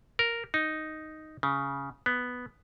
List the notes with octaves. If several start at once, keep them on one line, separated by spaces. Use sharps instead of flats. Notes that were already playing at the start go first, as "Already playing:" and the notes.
A#4
D#4
C#3
B3